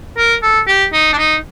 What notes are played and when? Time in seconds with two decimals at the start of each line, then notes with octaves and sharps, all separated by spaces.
0.17 A#4
0.43 A4
0.68 G4
0.93 D#4
1.13 D4
1.18 D#4